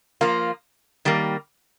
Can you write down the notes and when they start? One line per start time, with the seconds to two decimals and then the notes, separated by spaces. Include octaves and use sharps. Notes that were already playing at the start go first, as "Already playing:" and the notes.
0.21 F3 A#3 F4
1.05 D#3 G3 A#3